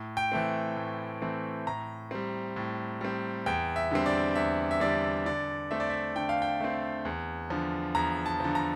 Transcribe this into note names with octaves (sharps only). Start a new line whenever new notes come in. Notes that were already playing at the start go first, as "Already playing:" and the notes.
Already playing: A2
G5
E3 A3 C4
A2
E3 A3 C4
A2 A#5
G3 C4
A2
G3 C4
E2 G5
E5
D3 G3 C4
D5
E2 E5
E5
D3 G3 C4 D5
D3 D5
A3 C4 E5
D5
E5
D3 G5
F5
G5
A3 C4
E2
D3 F3
E2 A#5
A5
D3 F3
A#5